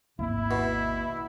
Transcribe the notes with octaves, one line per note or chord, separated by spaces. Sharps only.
G#1 D#2 A#3 E4
B2